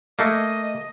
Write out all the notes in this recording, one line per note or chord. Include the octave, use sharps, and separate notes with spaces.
A3 A#3 D#5